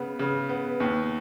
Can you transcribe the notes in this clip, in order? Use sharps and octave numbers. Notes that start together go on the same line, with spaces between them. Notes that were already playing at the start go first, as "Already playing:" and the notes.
Already playing: C#3 B3
C#3
B3
D#2